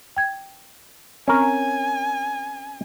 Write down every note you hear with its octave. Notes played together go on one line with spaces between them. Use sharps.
G5 G#6
C4 C#4 A#4 G#5